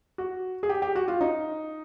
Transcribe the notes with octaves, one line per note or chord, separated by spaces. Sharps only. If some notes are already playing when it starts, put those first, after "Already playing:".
F#4
G#4
G4
G4
F#4
F4
D#4